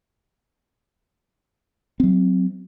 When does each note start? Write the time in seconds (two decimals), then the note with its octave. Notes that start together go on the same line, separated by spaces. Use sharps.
2.00 F#3 C4